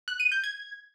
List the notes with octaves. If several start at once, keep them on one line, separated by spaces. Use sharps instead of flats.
F#6
D#7
G6
G#6